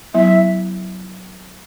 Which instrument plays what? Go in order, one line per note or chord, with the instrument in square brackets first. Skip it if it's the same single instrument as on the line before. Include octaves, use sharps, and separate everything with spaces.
[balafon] F#3 B3 E4 [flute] E5